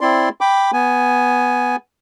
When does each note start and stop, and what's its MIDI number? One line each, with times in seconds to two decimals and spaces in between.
0.01 0.29 60
0.01 0.29 64
0.01 0.29 74
0.01 0.29 84
0.41 0.71 79
0.41 0.71 83
0.41 0.71 86
0.73 1.76 59
0.73 1.76 80